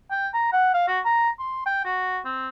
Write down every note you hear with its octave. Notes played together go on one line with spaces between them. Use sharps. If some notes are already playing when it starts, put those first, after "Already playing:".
G5
A#5
F#5
F5
F#4
A#5
C6
G5
F#4
C4